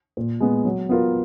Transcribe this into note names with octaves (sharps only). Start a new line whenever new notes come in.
A#2
G#3 B3
F#3
B3 F4 A#4